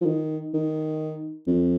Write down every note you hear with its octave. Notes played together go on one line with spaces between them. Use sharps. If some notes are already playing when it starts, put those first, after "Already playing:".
F3
D#3
D#3
F2